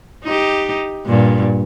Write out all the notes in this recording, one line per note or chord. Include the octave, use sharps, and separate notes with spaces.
D#4 G4
G2 A#2